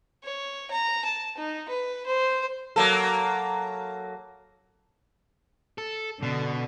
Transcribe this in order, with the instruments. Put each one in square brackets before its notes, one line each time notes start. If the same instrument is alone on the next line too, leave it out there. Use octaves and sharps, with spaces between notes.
[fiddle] C#5
A#5
A5
D#4
B4
C5
[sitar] F#3 A#3 A4
[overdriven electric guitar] A4
[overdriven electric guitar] B2 [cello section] D3